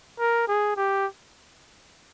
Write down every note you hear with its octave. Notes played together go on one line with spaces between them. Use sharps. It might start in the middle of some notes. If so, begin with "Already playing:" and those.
A#4
G#4
G4